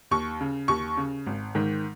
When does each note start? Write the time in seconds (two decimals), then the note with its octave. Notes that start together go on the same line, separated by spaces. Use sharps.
0.11 D#2 C#6
0.41 C#3
0.68 D#2 C#6
0.97 C#3
1.26 G#1
1.55 G#2 D#3